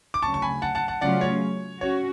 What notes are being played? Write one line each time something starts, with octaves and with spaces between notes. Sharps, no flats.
D6
D2 C#3 F#3 A5 C#6
C#6
G#5 B5
F#5 A5
F#5 A5
F#5 A5
C#3 F#3 A3 C#4 F4 D5 F#5
C#5
C#4 F#4 C#5